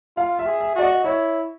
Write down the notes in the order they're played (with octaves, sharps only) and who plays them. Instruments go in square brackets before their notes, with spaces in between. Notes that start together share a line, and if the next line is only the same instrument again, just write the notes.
[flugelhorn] F4 [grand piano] F5
[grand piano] E5
[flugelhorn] G#4
[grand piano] E5
[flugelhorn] F#4 [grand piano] D5
[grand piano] D#5
[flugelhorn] E4 [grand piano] C#5